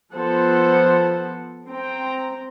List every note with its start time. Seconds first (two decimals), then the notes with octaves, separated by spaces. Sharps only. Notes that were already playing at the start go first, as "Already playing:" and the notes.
0.13 F3 B3 A4 C5 F#5
1.68 C4 G5 A#5